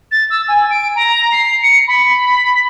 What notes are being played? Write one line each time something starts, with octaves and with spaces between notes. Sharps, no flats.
A6
E6
G#5
D7
A#5
C7
C#7
B5